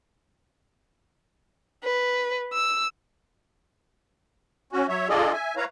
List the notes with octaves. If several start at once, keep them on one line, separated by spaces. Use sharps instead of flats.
B4
E6
C#4 F#4
F#3 C#5 E5
D4 F4 G#4 A4 D5 D#5
E5 G#5
E4 B4 C#5 F5 A#5